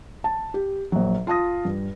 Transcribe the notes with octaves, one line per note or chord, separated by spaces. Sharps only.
A5
G4
A#1 F#3
F4 A5 D#6 A#6
G2